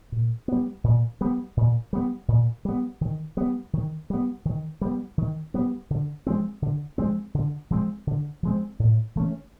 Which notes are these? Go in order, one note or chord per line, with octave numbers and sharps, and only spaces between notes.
A#2
G3 B3
A#2
G3 B3
A#2
G3 B3
A#2
G3 B3
D#3
G3 B3
D#3
G3 B3
D#3
G3 B3
D#3
G3 B3
D3
F3 G#3 C4
D3
F3 G#3 C4
D3
F3 G#3 C4
D3
F3 G#3 C4
A2
E3 A3 C#4